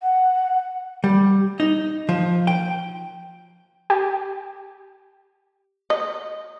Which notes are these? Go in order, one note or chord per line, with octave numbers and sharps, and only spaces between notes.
F#5
G3
D#4
F3
G5
G4
D#5